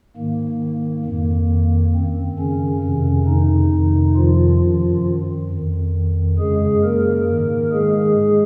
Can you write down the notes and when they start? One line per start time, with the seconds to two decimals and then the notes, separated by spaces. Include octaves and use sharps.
0.17 G#2 D#3 A#3
1.06 F2 D#3 A#3
1.94 F#2 D#3 C4
2.38 C#3 C#4
2.83 F2 C3 D#3
3.27 D#3 D#4
3.72 F2 C3 D#3
4.16 F3 F4
4.60 F#2 D#3
5.49 F2 D#3
6.38 F#2 C#3 G#3 G#4
6.83 A#3 A#4
7.28 G#2 D#3
7.72 G#3 G#4